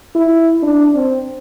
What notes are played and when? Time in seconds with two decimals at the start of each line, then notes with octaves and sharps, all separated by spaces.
0.15 E4
0.62 D4
0.94 C4